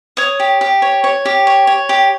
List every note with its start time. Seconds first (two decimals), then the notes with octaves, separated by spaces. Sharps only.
0.17 C#5 D#6
0.40 G4
0.61 G4
0.82 C#5
1.04 C#5
1.25 G4
1.47 C#5
1.67 C#5
1.89 G4